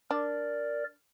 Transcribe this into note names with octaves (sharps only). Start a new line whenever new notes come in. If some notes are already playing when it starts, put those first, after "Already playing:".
D4 A#4 D5